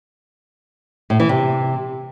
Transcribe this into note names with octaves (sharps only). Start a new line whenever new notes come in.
A2
E3
C3